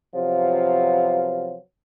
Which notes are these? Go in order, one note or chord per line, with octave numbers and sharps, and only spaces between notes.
C3 F3 F#3 B3 F4